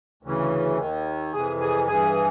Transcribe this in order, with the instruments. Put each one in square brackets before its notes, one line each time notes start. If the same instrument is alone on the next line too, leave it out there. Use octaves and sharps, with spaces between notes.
[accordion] D2 C#3 E3
D#2 D#3
F2 C3 E3 G#4 G#5
G#4 G#5
G2 E3 G#4 G#5